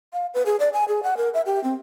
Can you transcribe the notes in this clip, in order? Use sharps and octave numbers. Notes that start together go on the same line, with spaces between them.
F5
B4
G#4
D5
G#5
G#4
F#5
A#4
E5
G4
C4